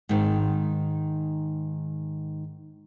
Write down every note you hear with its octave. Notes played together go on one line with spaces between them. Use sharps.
G#2 D#3